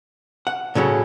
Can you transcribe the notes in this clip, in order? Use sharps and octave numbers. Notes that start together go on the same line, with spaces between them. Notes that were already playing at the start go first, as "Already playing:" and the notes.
F#5
A2 C#3 F#3 C#4